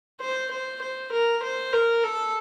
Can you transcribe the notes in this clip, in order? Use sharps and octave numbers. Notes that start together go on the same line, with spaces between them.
C5
C5
C5
A#4
C5
A#4
A4